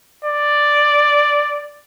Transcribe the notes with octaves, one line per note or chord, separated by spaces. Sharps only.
D5